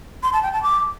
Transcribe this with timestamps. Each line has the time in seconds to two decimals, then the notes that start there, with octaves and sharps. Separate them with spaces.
0.23 C6
0.33 A5
0.43 G5
0.53 A5
0.63 D6